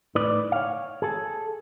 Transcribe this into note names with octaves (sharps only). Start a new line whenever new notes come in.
A2 D#4 B4 D5
C#5 F5
G#4 A4